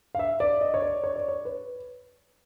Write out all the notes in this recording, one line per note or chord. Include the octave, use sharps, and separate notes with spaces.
F5
E5
D5
D#5
C#5
D5
C#5
D5
C#5
B4